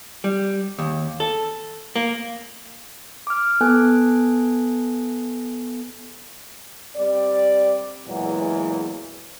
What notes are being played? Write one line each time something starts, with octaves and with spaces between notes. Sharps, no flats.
G3
D#2
A4
A#3
D6 F6
B3 A4 G#5 F#6
G3 C4 D5
E2 A#2 E3 F#3 G#3